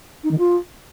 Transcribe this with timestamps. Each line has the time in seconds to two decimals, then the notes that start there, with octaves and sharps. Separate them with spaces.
0.24 D#4
0.31 D#3
0.38 F4